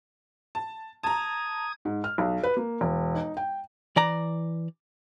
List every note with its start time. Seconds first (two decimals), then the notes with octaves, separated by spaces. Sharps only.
0.55 A5
1.03 A5 A#5 D#6 G#6
1.85 G#2
2.04 F6
2.18 B1
2.43 B4
2.57 A#3
2.81 E1
3.15 D#4
3.37 G5
3.96 E3 D5 A#5